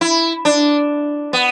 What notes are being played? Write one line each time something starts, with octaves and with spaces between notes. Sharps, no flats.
E4
D4
B3